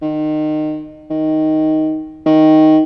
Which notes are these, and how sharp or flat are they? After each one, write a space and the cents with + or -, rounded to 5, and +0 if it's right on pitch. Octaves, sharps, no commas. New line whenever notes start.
D#3 -25
D#3 +5
D#3 +5